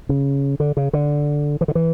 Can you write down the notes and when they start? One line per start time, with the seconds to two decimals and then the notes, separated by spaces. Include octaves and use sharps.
0.09 C#3
0.60 D3
0.77 C#3
0.93 D3
1.61 E3
1.68 D3
1.75 E3